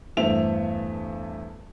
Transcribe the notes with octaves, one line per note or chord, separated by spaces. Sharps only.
E2 G2 A3 C5 E5 F7